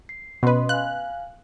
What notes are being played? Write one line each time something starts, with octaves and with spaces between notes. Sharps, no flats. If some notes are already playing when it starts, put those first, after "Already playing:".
C7
B2 C#4 B4 D#5 C6
F5 G#5 F#6